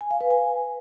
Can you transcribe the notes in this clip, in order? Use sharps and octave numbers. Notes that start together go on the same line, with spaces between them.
G#5
F5
B4
G#5